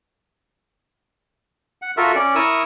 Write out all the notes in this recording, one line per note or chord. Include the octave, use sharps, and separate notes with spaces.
F#5
F4 F#4 A4 A#4 E5
C#4 D5
E4 A#4 C#6 D#6 E6